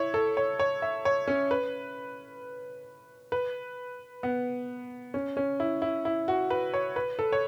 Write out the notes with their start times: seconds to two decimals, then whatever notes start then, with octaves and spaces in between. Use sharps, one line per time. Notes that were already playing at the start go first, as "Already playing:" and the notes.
Already playing: E4 C#5
0.14 A4
0.37 C#5
0.59 C#5
0.82 E5
1.05 C#5
1.28 C#4
1.51 B4
3.32 B4
4.23 B3
5.14 C#4
5.37 C#4
5.60 E4
5.82 E4
6.05 E4
6.28 F#4
6.50 B4
6.74 C#5
6.96 B4
7.19 A4
7.32 C#5